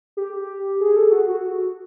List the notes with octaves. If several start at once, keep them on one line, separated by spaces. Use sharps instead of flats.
G4
G#4
A4
F#4
F#4